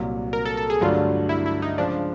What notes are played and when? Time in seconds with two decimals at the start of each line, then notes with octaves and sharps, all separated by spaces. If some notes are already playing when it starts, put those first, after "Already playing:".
Already playing: C2 A#2 F#3
0.33 A#4
0.45 A4
0.57 A4
0.70 G#4
0.81 G2 D3 F#3 A3 D4 F4
1.29 E4
1.46 E4
1.62 D#4
1.77 C#3 F3 G#3 D4